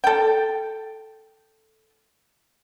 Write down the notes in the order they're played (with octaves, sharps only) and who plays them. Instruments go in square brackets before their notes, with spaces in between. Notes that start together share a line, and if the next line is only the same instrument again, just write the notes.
[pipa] A4 G5